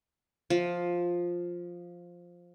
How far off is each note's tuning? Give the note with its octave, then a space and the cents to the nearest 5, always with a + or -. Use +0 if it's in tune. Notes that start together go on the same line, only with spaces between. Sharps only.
F3 +5